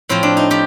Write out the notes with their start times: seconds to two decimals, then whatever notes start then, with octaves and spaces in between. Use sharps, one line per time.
0.09 A2 F3 C4
0.23 D4
0.37 D#4
0.51 F3 G4